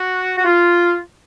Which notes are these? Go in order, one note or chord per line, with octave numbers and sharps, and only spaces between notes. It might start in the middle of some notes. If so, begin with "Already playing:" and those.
Already playing: F#4
F#4
F4